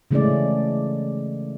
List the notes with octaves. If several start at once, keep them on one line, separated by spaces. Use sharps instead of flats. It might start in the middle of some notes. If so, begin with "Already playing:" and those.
C#3 E3 G#3 A3 C#4 D5